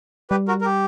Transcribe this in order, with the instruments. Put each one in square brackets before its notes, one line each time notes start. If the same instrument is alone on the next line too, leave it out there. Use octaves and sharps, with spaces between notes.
[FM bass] G3 [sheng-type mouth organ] G4 B4
[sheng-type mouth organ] F#4 A#4
A#4
G4